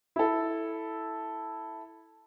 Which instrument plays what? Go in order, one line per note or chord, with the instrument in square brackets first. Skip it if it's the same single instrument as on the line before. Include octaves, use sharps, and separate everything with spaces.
[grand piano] E4 A4